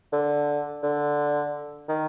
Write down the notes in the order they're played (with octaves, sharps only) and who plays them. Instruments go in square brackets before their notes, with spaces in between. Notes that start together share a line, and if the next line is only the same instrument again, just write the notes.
[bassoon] D3
D3
D#3